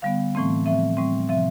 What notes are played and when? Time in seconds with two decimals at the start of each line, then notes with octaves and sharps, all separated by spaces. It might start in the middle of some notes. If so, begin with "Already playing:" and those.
0.02 D3 G3 B3 F5
0.35 A2 E3 A3 C4
0.66 A2 F3 C4 E5
0.97 A2 G3 C4
1.29 C3 F3 C4 E5